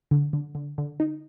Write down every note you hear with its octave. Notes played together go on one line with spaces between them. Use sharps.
D3
D3
D3
D3
D#4